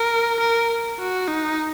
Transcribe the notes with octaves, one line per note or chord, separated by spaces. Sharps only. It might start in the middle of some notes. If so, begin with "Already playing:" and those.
Already playing: A#4
A#4
F#4
D#4